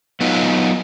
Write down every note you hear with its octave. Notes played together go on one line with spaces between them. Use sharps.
F#3 B3 D#4 F4